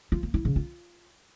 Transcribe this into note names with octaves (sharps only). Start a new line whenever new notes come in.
F4
A#3
E4
C#3
F4